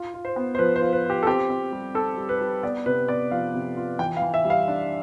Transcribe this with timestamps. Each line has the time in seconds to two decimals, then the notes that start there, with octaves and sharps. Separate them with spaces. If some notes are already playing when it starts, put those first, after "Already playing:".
Already playing: F4
0.14 F4
0.25 C5
0.36 B3
0.55 C5
0.59 F3 B4
0.76 C5
0.81 F4
0.93 B4
1.05 F4 G4
1.23 A4
1.27 C4 G4
1.50 C4
1.72 G3
1.94 C4 A4
2.17 G3
2.29 B4
2.41 G3
2.63 B3 D5
2.86 C3 B4
3.08 B3 D5
3.31 F3 F5
3.54 C3
3.76 F4
3.99 E3 G5
4.17 F5
4.22 E3
4.34 E5
4.45 G3
4.50 F5
4.68 D4